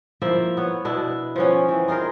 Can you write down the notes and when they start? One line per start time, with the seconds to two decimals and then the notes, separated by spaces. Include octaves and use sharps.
0.22 F3 A#3 E4 E5
0.57 B3 C#5
0.85 B2 D4 E4
1.36 F3 B3 C#4
1.68 E3 C4
1.88 D#4 F4 G#4 A#4